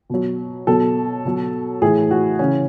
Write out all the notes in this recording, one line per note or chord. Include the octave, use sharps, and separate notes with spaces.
B2 F#3
B2 F#3 A4
B2 F#3
A2 E3 G#4
F#4
C#3 E3 C#4